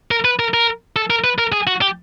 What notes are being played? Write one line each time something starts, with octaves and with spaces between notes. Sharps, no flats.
A#4
B4
A#4
A#4
A4
A#4
B4
A#4
G#4
F#4
G4